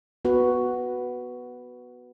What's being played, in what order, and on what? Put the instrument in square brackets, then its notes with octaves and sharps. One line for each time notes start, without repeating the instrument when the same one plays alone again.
[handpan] B3 F#4 B4